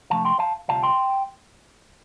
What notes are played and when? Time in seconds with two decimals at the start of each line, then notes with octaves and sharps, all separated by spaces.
0.10 C3 F3 A3 D4 F5 A5
0.25 G5 C6
0.39 F5 A5
0.68 D2 C3 G3 F4 F5 A5
0.83 G5 C6